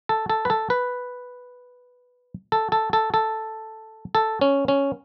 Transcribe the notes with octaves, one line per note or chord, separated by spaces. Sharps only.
A4
A4
B4
A4
B4
A4
A4
A4
A4
A4
C#4
C#4